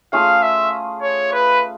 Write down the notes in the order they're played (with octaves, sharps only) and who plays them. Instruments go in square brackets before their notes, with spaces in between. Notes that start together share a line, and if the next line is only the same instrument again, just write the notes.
[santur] A3 C#4 F4 G#4 [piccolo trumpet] F5
[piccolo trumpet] E5
C#5
B4